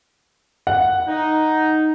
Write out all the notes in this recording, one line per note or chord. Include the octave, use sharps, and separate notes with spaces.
F#5
D#4